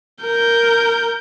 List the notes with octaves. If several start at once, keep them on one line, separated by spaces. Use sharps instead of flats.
A#4 G6